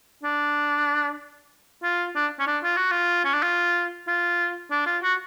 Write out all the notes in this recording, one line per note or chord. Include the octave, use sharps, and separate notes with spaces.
D4
F4
D4
C#4
D4
F4
F#4
F4
C#4
D4
F4
F4
D4
F4
F#4